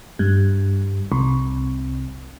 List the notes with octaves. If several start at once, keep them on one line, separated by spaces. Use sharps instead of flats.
G2
C2